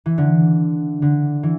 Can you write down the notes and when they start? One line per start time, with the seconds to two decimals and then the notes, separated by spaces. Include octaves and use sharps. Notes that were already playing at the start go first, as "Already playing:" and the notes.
0.06 E3
0.18 D3
1.02 D3
1.43 E3